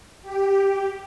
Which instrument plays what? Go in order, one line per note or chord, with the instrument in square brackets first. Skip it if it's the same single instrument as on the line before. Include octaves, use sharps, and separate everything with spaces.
[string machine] G4